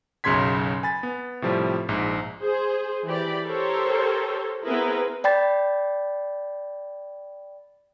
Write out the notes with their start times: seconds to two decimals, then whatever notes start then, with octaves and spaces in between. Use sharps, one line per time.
0.24 B1 F#2 C#3 C6 G#6 B6
0.83 G#5 B5 A6
1.03 B3
1.42 A2 C3 F3 G3
1.89 A#1 G#2
2.39 G#4 C5
3.07 E3 G4 D5 B5
3.46 G4 A4 A#4 C5 C#5
4.63 B3 C4 E4 G#4 A#4 B4
5.24 D5 G5 B5 A6